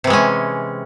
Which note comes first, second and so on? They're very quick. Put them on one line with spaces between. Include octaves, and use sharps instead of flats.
C3 E3 G#3 C#4